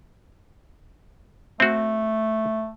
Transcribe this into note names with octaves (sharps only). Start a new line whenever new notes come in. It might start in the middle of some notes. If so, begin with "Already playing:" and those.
A3 C4 F#4